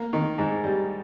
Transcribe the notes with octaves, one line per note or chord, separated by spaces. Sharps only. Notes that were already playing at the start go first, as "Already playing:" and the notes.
Already playing: A#3
D#3
G#2
G3